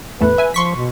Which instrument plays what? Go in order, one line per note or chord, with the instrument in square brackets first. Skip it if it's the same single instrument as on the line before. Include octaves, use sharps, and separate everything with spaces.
[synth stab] A1 E2 A3 [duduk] B4
[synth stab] E5 G#5
[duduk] F3 [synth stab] C6 C#6 B6
[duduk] B2